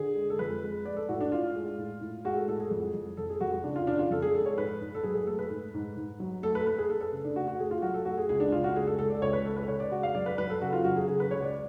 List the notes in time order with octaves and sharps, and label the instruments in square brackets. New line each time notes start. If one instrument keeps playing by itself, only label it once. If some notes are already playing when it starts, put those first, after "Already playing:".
Already playing: [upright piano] D3 G#4
G#3
A4
F2 B4
G#3
G#3 D5
A4
A2 F#4
D4
A2 F4
G#3
A2
A2
G#3 F#4
A4
A2 A4
G#4
F2
F2
F2 A4
G#4
F2 F#4
F#4
C#3 D4
F4
C#3 D4
F4
F2 A4
G#4
G#3 A4
C#5
G#2 B4
G#2
A4
F#3 G#4
G#4
A3 A4
B4
G#2
G#2
G#2
F#3
A3 A4
B4
A4
A3 B4
G#4
A3 A4
A4
C#3
D4
A3 F#4
F#4
A3 G#4
F4
F#3 F#4
A4
A3 F#4
G#4
C#2 G#4
D4
C#3 F4
F#4
G#3 G#4
A4
C#2 A4
D5
C#2 C#5
B4
G#3 A4
B4
C#3 C#5
D5
G#3 F#4
F5
F#3 D5
B4
F#3 B4
A4
C#3 F#4
F4
F#3 F#4
G#4
C#3 G#4
B4
C#2 C#5
D5